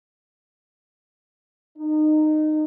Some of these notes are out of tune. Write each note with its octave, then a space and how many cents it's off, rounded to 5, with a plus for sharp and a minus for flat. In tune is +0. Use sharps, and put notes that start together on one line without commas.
D#4 -20